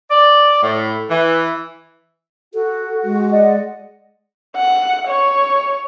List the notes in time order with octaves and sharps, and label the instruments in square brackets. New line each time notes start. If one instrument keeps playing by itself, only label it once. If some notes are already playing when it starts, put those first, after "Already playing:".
[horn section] D5
A2
E3
[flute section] F#4 [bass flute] A4
[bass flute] G#3
[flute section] D5 D#5 F#5
[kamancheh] F#5
C#5